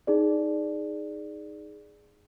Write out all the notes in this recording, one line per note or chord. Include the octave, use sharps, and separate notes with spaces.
D#4 G#4 D5